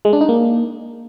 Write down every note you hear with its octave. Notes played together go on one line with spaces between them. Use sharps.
G#3
D4
D#4
A#3